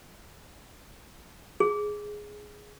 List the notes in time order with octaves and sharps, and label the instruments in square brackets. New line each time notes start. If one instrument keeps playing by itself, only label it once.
[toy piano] G#4